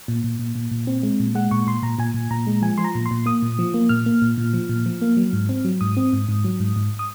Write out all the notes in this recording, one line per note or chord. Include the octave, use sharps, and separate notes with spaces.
A#2
A#2
A#2
A#2
A#2
C4
G#3
A#2
G#3 F#5
A#2 C#6
A#2 C6
A#2 A#5
A#2 G#5
A#2
A#2 A#5
G#3
F3 G#5
F3 C6
A#5
A#2
C6
A#2
A#3 D#6
A#2
F3
A#3
A#2 F6
A#3
A#2
A#2
F3
A#2
F3
A#3
F#3
G#2
C4
F#3
G#2 D#6
C4
G#2
G#2
F#3
G#2
G#2
D#6